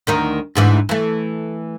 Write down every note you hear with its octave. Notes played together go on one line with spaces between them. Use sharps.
D2 D#3 D#4
D2 G#2 E3
E3 A3